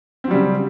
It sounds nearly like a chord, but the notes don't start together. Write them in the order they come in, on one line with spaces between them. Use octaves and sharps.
C4 F#3 G3 C#3